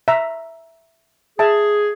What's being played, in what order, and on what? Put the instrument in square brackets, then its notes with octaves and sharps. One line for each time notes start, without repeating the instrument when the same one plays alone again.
[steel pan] E5 A#5
[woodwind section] G#4 [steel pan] E5 A5